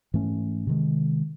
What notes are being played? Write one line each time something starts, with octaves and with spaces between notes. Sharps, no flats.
G#2 E3 A3 C#4
C3 D#3 G#3